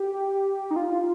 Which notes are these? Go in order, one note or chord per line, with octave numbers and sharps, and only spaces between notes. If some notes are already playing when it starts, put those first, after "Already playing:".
Already playing: G4
D#4
F4